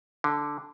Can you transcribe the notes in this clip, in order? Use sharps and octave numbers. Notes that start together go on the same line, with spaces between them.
D3